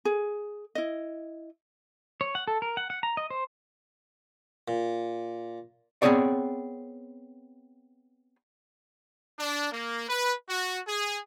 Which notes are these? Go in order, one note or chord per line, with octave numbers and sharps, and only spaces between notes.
G#4
E4 D#5
C#5
F#5
A4
A#4
F#5
F#5
A#5
D#5
C5
A#2
B3 C4 F#4 G#4 C#5 D5
D4
A#3
B4
F#4
G#4